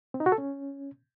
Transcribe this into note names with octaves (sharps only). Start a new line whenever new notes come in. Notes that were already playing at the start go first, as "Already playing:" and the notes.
C4
D#4
F#4
A4
C#4